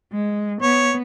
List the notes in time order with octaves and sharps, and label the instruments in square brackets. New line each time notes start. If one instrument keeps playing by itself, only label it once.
[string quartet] G#3
[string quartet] B3 [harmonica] C#5